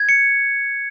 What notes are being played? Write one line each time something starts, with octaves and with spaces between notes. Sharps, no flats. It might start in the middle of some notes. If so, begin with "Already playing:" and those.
Already playing: G#6
C#7